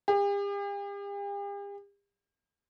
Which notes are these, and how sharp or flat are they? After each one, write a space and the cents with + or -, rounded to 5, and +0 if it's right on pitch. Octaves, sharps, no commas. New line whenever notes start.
G4 +45